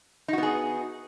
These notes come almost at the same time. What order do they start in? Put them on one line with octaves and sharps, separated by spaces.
D#4 F#4 B3 G#4